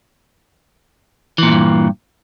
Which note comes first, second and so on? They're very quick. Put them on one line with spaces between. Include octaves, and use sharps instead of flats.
E3 A#2 E2 G2